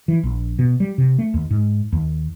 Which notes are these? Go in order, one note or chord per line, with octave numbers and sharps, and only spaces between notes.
E3
A#1
B2
G3
C3
A3
D#2
G#2
D#2